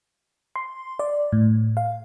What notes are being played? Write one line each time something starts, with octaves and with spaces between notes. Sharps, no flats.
C6
D5
A2
F5